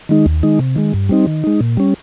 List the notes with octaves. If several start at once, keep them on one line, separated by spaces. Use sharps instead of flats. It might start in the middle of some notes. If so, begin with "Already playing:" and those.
D#3 G#3 D#4
D#2
D#3 G#3 D#4
C3
D#3 G#3
G2
G3 C4 D#4
D#3
G#3 D#4
A#2
G3 C#4